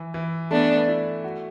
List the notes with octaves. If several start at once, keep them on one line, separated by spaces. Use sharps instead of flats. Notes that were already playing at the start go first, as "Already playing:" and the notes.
Already playing: E3
E3
A3 B3 D4
E4
F#4